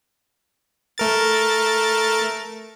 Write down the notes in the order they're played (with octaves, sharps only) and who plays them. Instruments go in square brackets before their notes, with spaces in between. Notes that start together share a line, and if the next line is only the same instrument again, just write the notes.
[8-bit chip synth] A3 A#4 A6